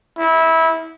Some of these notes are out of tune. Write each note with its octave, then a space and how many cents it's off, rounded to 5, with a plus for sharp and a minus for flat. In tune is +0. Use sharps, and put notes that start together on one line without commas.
E4 -20